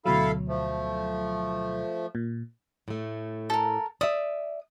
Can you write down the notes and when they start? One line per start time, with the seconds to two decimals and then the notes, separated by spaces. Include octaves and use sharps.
0.06 D2 B2 F#3 E4 A4 F5
0.48 F3 A3
2.15 A#2
2.88 A2 A3
3.50 A4 A#4
4.01 D5 E5 D#6